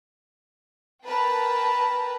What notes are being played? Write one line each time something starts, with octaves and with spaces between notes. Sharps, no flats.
A#4 B4 G5 A5